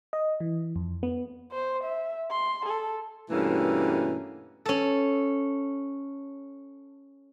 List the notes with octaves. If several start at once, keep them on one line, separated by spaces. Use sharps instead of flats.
D#5
E3
F2
B3
C5
E5
C6
A4
G2 B2 E3 A3 A#3 C#4
C#4 A4